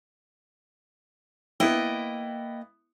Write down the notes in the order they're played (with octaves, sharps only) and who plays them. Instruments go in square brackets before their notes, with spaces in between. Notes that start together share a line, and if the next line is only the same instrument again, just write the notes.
[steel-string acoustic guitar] A#3 D#5 G5 [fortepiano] B3 E4